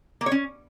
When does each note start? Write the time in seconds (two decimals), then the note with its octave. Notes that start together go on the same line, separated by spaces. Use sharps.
0.21 A#3
0.26 C#5
0.31 C#4